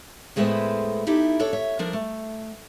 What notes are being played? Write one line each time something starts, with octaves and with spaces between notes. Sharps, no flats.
A2 G#3 A3 B3 B4 C5
D#4 E4 G4 A4
D4 A4 C#5
C#5 E5
F3 D4 A#4
A3